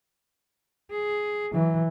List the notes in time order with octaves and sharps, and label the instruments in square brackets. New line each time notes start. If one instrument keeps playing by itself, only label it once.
[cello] G#4
[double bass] E3 [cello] F#3